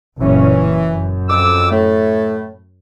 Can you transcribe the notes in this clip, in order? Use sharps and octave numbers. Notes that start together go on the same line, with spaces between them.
F#1 A#2 E3 C#4
F#2
F2 D6 E6
A2 A3